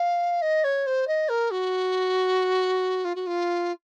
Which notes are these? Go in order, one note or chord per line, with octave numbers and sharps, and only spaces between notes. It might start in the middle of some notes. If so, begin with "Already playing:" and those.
Already playing: F5
D#5
C#5
C5
D#5
A#4
F#4
F4
F#4
F4